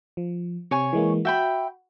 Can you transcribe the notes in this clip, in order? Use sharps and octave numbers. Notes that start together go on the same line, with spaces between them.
F3
C3 C#5 G#5 C#6
E3 G#3 A#3
F#4 E5 G5 B5